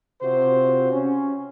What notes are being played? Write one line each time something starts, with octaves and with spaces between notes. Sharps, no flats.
C3 F4 F#4 C5
C#4